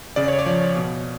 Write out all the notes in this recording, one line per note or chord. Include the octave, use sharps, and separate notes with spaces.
C#3 D5
C#5
D5
F3
B2